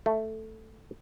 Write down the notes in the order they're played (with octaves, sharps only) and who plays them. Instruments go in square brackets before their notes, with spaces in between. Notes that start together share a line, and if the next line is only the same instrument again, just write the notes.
[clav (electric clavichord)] A3